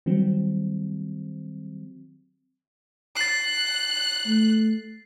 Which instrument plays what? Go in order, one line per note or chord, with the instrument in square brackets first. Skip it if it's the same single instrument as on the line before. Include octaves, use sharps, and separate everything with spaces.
[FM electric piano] D#3 F#3 G3 C4
[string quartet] F#6 [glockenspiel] A6 C7
[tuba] A3